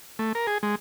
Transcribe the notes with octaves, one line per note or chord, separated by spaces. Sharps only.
A3
A#4
G#4
G#3